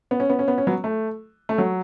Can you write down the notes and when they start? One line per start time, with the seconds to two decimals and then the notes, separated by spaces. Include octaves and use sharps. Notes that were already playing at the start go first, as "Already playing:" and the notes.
0.11 B3
0.20 C#4
0.30 B3
0.39 C#4
0.48 B3
0.58 C#4
0.67 F#3 B3
0.84 A3
1.49 A3
1.58 F#3